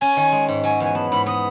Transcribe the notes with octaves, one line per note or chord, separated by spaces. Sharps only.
C#4 G#5
D#3
G#3
G#2
F#3 G#5
E2 G#5
B3 A5
G#2 B5
B3 D#6